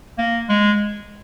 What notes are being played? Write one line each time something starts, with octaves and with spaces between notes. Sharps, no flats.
A#3
G#3